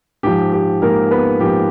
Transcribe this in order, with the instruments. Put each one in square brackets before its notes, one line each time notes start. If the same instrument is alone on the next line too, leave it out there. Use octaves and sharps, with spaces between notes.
[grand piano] G#2 F3 G4
G4
G#2 F3 A#3 A#4
B3 B4
G#2 F3 G4